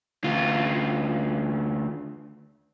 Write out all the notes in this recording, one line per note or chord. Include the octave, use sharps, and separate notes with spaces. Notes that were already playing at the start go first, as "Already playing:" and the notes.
D2 F4